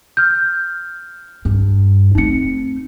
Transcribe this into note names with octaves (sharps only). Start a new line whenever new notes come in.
F6 G6
G2
A3 C4 D#4 C#7